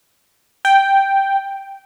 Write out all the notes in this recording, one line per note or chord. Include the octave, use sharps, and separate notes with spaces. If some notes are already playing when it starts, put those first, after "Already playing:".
G5